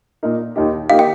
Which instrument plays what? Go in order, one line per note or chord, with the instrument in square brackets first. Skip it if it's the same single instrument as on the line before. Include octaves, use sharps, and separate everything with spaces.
[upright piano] A#2 A#3 D#4 A#4
D#2 D#3 A#3 D#4 G4
[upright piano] D#3 A#3 D#4 G4 [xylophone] F5
[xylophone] G5